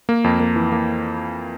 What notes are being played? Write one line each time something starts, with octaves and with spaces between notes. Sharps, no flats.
A#3
F2
A#3
E3
A#3